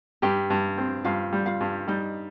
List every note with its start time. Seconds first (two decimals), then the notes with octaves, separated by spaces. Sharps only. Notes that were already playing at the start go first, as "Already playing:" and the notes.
0.22 G2 G4 G5
0.50 G2
0.78 C4
1.04 G2 F4 F5
1.33 G3
1.46 F4 F5
1.60 G2
1.88 G3 D#4 D#5